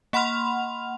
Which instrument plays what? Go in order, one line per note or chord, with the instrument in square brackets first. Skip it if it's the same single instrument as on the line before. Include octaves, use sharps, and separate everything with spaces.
[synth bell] A#3 F#5 B5 C6 F6 F7